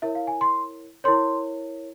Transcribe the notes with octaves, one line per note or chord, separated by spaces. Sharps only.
E4 A#4 C#5 E5
F5
G#5
C6
E4 A#4 C#5 C6